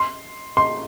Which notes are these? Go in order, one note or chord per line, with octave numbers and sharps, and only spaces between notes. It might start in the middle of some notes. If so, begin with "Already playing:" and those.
Already playing: C6
C6